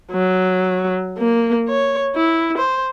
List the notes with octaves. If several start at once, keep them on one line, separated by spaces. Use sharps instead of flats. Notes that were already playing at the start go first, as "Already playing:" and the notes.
F#3
A#3
C#5
E4
C5